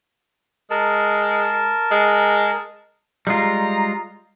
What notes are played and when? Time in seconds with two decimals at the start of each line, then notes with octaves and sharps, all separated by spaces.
0.70 G#3 A#4 A5
1.91 G#3
3.27 G3 G#3 F4 A#5